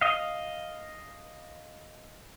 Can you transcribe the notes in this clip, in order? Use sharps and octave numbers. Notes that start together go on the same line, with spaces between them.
D#5 F5